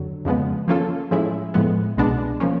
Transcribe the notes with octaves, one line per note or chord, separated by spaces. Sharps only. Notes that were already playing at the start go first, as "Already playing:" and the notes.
Already playing: F2 D3 F#3
F2 C#3 F3 G#3 B3
F3 A#3 C#4 F4 A4
A2 F3 G#3 C#4 E4
A2 F3 G#3 B3
C2 B2 G#3 B3 D4
F3 A#3 C#4